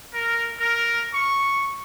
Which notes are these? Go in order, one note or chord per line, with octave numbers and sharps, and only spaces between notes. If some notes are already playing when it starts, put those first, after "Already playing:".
A#4
A#4
C#6